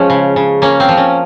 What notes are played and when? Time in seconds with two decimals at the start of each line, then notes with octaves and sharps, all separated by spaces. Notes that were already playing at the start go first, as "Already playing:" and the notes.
Already playing: F3 G#3 C#4
0.10 C#3
0.36 C#3
0.62 A#3 C#4
0.80 C4
0.89 F3
0.97 C#4